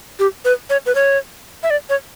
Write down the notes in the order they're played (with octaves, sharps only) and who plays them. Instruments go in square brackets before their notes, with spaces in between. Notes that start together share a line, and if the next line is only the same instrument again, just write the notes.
[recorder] G4
B4
C#5
B4
C#5
E5
D5
C#5